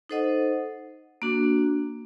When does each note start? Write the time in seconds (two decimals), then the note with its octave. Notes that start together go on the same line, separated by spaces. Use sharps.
0.10 D#4 A4 C5 D#5 F#5
1.22 A#3 D4 F#4